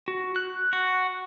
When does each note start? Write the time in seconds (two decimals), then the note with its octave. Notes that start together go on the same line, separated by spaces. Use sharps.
0.08 F#4
0.36 F#6
0.73 F#4